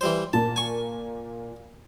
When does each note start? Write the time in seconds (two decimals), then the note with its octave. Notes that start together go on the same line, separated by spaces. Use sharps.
0.01 E3 G3 C5
0.33 A#2 A#3 A5
0.56 G#5 C#6